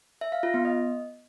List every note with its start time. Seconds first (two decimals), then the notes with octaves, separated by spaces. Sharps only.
0.21 E5
0.32 F5
0.43 F4
0.54 B3
0.65 D#5